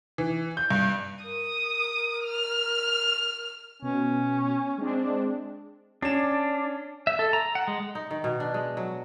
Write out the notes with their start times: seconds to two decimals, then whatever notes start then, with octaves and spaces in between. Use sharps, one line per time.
0.18 E3
0.57 G6
0.71 G2
1.24 A#4 D#6
2.25 F6
3.82 B2 C#4
4.78 G#3 C4 D4
6.02 C#4 D4 E7
7.07 E5
7.19 A4
7.33 A#5
7.55 F#5
7.68 G#3
7.95 D#4
8.11 D#3
8.24 B2
8.40 D4
8.54 G#3
8.77 F#3